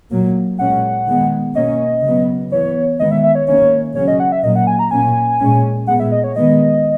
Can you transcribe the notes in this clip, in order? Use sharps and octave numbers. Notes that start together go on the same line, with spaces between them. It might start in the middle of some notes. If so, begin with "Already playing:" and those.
A#2 F#3 A#3
A#2 G#3 C#4 F#5
D#3 G#3 B3
B2 A#3 C#4 D#5
C#3 F#3 B3
E3 B3 C#5
D#3 G#3 B3 D#5
E5
E5
C#5
D#3 A#3 C#4 C#5
C#3 F#3 C#4 C#5
D#5
F#5
E5
A#2 F#3 A#3 D#5
F#5
G#5
A#5
A#2 A#3 C#4 G#5
A#2 G#3 C#4
A#2 G#3 B3 F#5
E5
D#5
C#5
D#3 G#3 B3 D#5